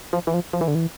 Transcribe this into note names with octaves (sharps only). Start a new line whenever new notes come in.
F3
E3
F3
F3
E3
D3
E3